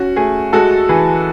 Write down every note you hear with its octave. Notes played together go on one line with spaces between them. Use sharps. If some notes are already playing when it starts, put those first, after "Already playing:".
Already playing: C#4 F#4
A3 G#4
G#3 F#4 A4
E3 G#4 B4